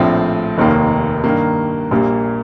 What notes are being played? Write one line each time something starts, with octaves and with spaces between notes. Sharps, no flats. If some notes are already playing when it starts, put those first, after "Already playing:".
Already playing: A#1 A2 F3 A3 C4
F1 D#2 D#3 A#3
G2 D#3 A#3
A#1 A#2 G3 A#3